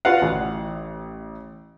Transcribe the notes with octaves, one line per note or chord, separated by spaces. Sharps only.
F4 F#4 B4 F5 F#5
A1 E4